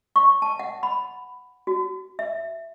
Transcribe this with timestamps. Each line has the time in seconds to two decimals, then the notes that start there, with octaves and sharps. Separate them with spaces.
0.16 C#6
0.42 A5
0.59 F#5
0.83 B5
1.67 F#4
2.19 E5